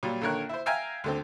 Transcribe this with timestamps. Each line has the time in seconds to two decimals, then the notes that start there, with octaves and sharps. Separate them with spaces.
0.03 A#2 F#3 G3
0.21 A#1 D3 D#3 A#4 C#5 F#6
0.49 E4 C5
0.66 E5 F5 G5 G#5 A#5
1.04 D2 D3 C4